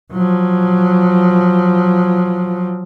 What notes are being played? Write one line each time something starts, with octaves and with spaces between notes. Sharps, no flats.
F3 F#3